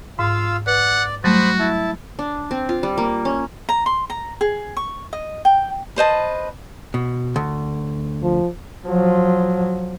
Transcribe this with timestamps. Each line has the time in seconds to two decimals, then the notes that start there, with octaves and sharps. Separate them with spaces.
0.19 G#2 F4 F5 E6
0.67 B4 D5 F#5
1.24 F#3 G3 A3 F#4 C5 B5 D#6
1.60 E4 A5
2.19 D4
2.51 C4
2.69 F4
2.83 G3
2.98 A#3
3.25 C#4
3.69 A#5
3.86 C6
4.10 A#5
4.41 G#4
4.77 C#6
5.13 D#5
5.45 G5
5.96 B4 C5 D#5 A5
6.94 B2
7.36 D2
8.23 F3
8.87 F3 F#3